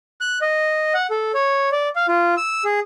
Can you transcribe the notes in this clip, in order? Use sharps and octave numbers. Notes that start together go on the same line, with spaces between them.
F#6
D#5
F#5
A4
C#5
D5
F5
F4
E6
G#4